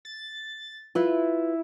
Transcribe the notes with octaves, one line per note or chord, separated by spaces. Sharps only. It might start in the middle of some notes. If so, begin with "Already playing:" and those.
A6
E4 F4 B4